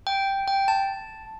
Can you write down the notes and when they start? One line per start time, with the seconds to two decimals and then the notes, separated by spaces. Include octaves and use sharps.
0.07 G5
0.48 G5
0.68 A5